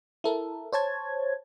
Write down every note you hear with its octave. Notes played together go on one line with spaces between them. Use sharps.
E4 A4 A#4
C5 C#5 A5 G#6